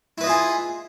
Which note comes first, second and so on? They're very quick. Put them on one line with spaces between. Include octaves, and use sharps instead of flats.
E4 B4 D#5 F4 G#4